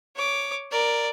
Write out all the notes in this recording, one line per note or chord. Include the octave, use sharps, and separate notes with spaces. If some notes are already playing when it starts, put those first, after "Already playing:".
C#5 D6
A#4 D5